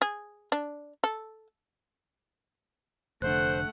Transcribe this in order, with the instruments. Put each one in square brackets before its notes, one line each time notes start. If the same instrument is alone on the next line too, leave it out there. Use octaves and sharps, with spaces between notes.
[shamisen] G#4
D4
A4
[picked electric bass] F1 D3 [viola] A3 F#5 [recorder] C5 [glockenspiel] F#6